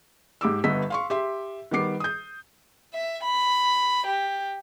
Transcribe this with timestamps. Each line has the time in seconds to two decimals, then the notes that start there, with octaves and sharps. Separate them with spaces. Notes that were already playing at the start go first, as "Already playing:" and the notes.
0.41 G#2 G4 D6 E6
0.64 G1 G2 B3 D#5 E6 B6
0.90 F5 C6 C#6
1.10 G4 E5 C6
1.71 D#3 G3 B3 D6 C7
2.00 D#6 G6
2.94 E5
3.24 B5
4.07 G4